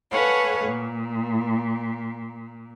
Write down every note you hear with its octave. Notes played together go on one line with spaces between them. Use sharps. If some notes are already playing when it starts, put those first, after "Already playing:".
A4 B4 C#5 F5 F#5 G#5
A#2